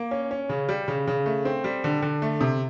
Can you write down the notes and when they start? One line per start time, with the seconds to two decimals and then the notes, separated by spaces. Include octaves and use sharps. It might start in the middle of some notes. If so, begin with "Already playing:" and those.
Already playing: A#3
0.11 C#4
0.31 C#4
0.49 C#3
0.69 G3
0.88 C#3
1.07 C#3
1.26 A3
1.45 C4
1.64 G3
1.84 D3
2.02 D3
2.22 A3
2.41 C3